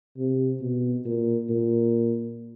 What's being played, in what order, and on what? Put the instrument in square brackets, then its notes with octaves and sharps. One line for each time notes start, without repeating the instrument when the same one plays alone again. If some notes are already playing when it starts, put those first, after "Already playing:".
[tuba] C3
B2
A#2
A#2